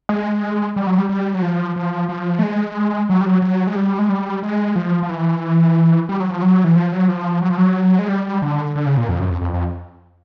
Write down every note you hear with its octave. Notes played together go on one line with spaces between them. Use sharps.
G#3
G3
F#3
G3
G3
F#3
F3
F3
F3
A3
G#3
F#3
G3
F#3
F#3
G#3
G3
G#3
G3
G#3
F3
F3
E3
G3
F#3
F3
F#3
E3
F3
F#3
F3
F#3
F3
F#3
G#3
G3
D3
D3
C#3
A#2
F2
F#2
F2
F2
F2